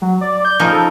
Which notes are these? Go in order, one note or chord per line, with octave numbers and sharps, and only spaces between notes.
F#3
D5
G6
C#3 F3 D#4
A4